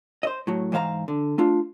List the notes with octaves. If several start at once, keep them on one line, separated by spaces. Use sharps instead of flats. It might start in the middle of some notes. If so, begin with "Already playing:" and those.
C5 D#5
A2 F#3
G#2 E3 C5 F5 A#5
D3
A3 D4 F4